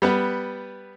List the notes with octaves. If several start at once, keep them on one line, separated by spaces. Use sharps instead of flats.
G3 B3 B4